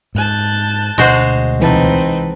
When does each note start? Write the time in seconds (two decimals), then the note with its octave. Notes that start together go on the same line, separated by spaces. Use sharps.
0.15 G#2 A5 F#6 G6
0.98 D2 B2 G#3 D4 F#4 C5
1.60 C2 E3 C4 D#4 B4 A5